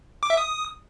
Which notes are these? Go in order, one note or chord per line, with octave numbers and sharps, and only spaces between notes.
D6
E5
D#6